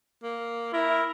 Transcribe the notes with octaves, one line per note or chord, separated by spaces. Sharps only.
A#3
E4 A#4